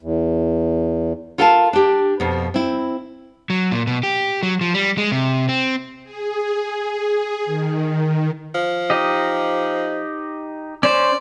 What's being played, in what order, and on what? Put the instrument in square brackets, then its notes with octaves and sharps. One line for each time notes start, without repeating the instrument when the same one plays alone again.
[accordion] E2
[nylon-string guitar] F4 A4 A#4 F5 G#5 A5
D4 G4
F2 B2
C4 E4
[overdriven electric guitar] F#3
A#2
B2
G4
F#3
F3
G3
G#3
C3
C4
[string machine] G#4
D#3
[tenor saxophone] F3
[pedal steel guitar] D#4 G4 D#5
[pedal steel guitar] C#4 C5 [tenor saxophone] D5